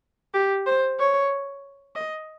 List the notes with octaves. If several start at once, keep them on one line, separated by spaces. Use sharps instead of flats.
G4
C5
C#5
D#5